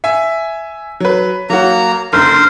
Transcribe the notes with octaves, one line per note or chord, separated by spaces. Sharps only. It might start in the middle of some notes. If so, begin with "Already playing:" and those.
E5 G#5
F#3 B4
F#3 A#3 F#4 A#5
F#1 D3 A#4 C5